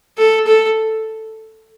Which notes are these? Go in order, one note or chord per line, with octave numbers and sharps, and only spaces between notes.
A4
A4